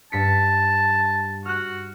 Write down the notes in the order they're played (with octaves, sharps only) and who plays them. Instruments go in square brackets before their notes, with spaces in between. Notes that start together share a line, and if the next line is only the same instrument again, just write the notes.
[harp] G2 B6 C#7 [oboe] A5
[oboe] F#4 [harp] F6 F#6